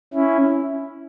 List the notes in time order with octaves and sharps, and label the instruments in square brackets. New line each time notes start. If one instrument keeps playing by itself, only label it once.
[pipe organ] C#4 E4